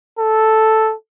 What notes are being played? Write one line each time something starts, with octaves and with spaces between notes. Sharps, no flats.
A4